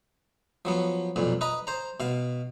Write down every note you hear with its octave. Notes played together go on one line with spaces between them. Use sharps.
F3 F#3 B3
B1 F2 A#2
B4 D#5 A#5
C5 A#5
B2 F5